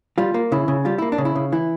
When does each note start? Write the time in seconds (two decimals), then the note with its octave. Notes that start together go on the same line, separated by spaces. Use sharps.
0.18 G3 F4
0.34 A#3
0.52 C#3 E4
0.68 C#3
0.85 G3 F4
0.98 A#3 E4
1.12 D4
1.18 C#3
1.25 E4
1.35 C#3
1.52 E3 E4